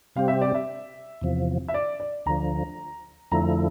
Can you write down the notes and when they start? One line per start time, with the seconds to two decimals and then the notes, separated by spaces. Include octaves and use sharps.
0.16 C3 G3 C4 G4 F5
0.28 E5
0.41 D5
0.54 E5
1.21 E2 C3 F3
1.68 E5
1.74 D5
2.00 D5
2.26 D2 D3 F3 A#5
3.32 F2 D3 F3 A3 E4 A#5